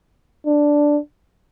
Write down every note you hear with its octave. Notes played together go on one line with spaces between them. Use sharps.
D4